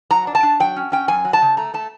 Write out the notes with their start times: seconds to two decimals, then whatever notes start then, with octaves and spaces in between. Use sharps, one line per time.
0.11 F#3 A#5
0.27 D4
0.35 A5
0.43 D4
0.60 F#3 G5
0.76 C#4
0.92 C#4 G5
1.08 F#2 G#5
1.25 F#3
1.33 A5
1.42 C#3
1.57 A3 A#5
1.74 A3 A5